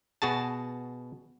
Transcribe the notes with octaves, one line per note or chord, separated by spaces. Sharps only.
B2 F#4 G#4 A5